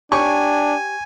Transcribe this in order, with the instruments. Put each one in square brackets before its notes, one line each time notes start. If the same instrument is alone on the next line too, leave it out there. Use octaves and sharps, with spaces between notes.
[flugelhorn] D4 [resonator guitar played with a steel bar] G4 C#5 G5 [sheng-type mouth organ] G#5 [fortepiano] C#6